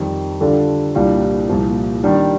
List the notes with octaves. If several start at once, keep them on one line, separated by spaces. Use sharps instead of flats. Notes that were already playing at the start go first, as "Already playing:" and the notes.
Already playing: F2 D#3 G3
D3 G3 D4 F4 A4
C2 A#2 G3 D4 F4
C2 A#2 F3
D#3 G3 D4